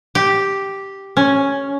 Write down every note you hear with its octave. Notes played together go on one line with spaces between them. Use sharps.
G4
C#4